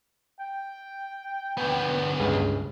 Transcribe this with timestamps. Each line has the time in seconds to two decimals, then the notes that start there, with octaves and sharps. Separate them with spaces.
0.40 G5
1.57 D2 B3
2.20 C#2 G2 G#4